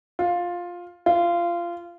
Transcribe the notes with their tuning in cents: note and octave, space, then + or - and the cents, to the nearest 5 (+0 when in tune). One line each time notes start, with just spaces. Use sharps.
F4 +10
F4 -20